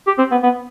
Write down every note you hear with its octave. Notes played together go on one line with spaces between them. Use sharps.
G4
C4
B3
B3